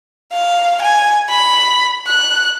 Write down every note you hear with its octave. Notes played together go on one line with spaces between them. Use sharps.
F5
G#5
B5
F#6